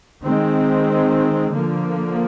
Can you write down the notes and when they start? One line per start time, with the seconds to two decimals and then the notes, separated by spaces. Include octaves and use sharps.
0.24 D#3 G#3 C4
1.54 D3 F3 A#3